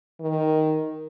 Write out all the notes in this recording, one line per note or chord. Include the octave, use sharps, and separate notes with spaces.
D#3